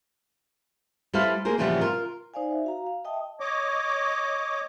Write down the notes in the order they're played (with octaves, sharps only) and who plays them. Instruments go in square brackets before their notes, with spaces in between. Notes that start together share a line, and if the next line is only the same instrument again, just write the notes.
[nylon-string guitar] G3 E4 A4 B4 C5 F5
A#3 G#4 A#4 C5
A#2 C#3 E3 F3 G3 B3
F4 A#4
[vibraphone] D#4 C5 D5 F5 G#5
E5
F#4 F5 A#5
F5
D#5 E5 G5 A5 D#6
[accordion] C#5 D#5 D6